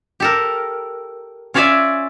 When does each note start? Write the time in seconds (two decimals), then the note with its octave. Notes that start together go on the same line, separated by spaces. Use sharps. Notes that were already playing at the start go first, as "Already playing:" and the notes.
0.20 G4 A4 A#4
1.54 C#4 F4 C#5 D5 E5 G#5